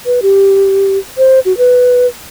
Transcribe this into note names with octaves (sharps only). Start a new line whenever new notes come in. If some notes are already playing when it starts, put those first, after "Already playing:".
B4
G4
C5
F#4
B4